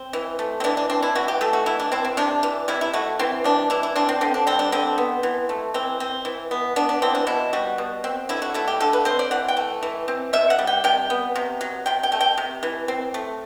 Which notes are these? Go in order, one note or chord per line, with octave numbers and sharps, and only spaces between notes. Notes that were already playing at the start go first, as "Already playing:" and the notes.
Already playing: C4
E3
A3
C4
E3 D4
D4
C4 D4
E4
E3 F#4
G4
A3 A4
F#4
E3 E4
D4
C4 E4
C4
C3 D4
E3
C3 E4
E4
A3 F#4
E3 C4
G3 D4
E3 E4
E4
C4 D4
C4
D3 C4
D4
G3 C4
D4
D3 C4
B3
E3
A3
E3 C4
C4
E3
B3
B3 D4
D4
E3 C4
D4
B2 E4
G3 F#4
B2
C4
D3 E4
F#4
A3 E4
G4
D3 A4
B4
C4 C5
D5
E3 F#5
G5
A3
E3
C4
C3 E5
F#5
G3
G5
C3 G5
B3
C3
F#3
C3 G5
G5
A3
G5
C3
E3
C4
A3